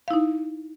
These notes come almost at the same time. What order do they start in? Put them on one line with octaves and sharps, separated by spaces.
F5 E4 D#4